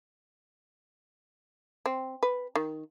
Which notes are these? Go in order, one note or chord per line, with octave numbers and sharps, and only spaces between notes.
C4
B4
D#3